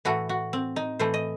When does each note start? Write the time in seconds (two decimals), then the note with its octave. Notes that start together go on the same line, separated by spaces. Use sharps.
0.05 A2 E3 A3 F#4
0.29 F#4
0.53 C4
0.76 D#4
0.99 A2 E3 A3 C5
1.14 D#5